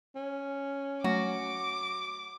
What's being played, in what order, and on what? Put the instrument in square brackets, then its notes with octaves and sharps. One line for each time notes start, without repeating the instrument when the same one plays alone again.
[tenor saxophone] C#4
[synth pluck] F#3 A3 [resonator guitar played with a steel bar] F#4 [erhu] D6